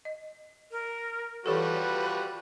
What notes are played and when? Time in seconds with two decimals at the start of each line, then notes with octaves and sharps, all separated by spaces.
0.05 D#5
0.71 A#4
1.46 E3 F3 G3 F#4 G4 A4 B4